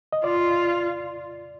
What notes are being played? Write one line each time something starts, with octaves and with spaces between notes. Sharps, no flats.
D#5
F4 D5